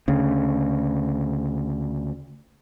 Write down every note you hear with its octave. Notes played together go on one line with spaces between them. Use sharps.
D2 C#3